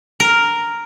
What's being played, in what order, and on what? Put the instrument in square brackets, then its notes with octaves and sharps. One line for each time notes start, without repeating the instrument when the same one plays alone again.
[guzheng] A#4